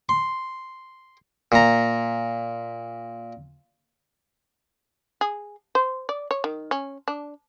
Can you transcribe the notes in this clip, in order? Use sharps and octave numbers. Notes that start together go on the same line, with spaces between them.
C6
A#2 A#5
G#4
C5
D5
C#5
D#3
C#4
D4